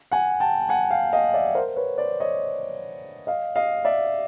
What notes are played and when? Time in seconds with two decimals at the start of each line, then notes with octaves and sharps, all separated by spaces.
0.12 F#5 G#5
0.40 G5 A5
0.69 F#5 G#5
0.90 F5 G5
1.13 D#5 F5
1.34 D5 E5
1.55 A#4 C5
1.76 B4 C#5
1.98 C5 D5
2.20 C#5 D#5
3.27 D#5 F5
3.56 D#5 F5
3.85 D5 E5